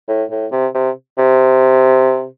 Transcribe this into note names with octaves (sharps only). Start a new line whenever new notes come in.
A2
A2
C3
C3
C3